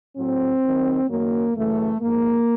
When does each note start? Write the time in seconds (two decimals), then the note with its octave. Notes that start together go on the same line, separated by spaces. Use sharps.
0.17 A2 F#3 C4
0.63 D#2 D#3 F#3
1.09 F#2 D#3 F#3 A#3
1.54 F#2 C#3 E3 A3
2.01 G#2 F3 A#3